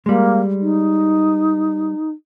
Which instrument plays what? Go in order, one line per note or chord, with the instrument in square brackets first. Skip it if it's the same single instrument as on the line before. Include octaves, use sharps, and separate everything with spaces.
[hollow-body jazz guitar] G3 G#3 [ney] A#3
[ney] D#4